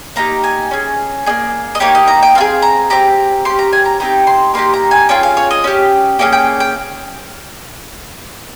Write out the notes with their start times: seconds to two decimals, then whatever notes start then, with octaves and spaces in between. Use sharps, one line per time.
0.16 A#3 D#4 G4 A#5
0.44 G#5
0.71 C#4 G#4
1.26 A#3 D#4 G#4
1.75 D#5
1.80 A#3 D#4 G4 C#5
1.95 D#5
2.08 A#5
2.22 G5
2.35 C4 F4 F5
2.41 G#4
2.62 A#5
2.90 C4 G4 A#5
3.45 C#4 G4 C6
3.59 A#5
3.73 G#5
3.86 A#5
4.00 C4 D#4 G4 A#5
4.27 C6
4.54 A#3 D#4 G4 C6
4.74 A#5
4.91 G#5
5.09 C#4 F4 G#4 G5
5.23 F5
5.37 C#5
5.51 D#5
5.64 C#4 G4
6.19 A#3 C#4 G#4 G5
6.33 G5
6.60 G5